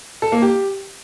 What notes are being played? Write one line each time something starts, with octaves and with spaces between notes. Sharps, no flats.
A4
A#3
G4